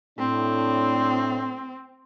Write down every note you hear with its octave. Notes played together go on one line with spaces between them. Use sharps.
A2 C4 D4